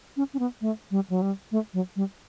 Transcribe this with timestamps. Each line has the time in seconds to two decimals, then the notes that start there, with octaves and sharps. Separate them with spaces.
0.17 C#4
0.34 C#4
0.39 B3
0.61 A3
0.91 G3
1.10 F#3
1.22 G3
1.52 A3
1.74 F#3
1.96 G3